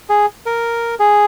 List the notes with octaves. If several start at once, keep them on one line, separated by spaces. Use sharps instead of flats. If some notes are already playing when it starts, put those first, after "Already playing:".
G#4
A#4
G#4